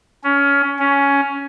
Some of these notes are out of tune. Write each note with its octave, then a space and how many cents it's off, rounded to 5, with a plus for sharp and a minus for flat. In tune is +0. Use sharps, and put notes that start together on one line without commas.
C#4 +20
C#4 +10